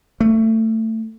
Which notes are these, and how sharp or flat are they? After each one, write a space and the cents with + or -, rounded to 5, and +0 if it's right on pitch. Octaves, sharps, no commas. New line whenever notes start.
A3 +20